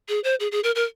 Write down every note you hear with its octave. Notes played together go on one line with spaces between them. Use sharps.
G#4
C5
G#4
G#4
A#4
A#4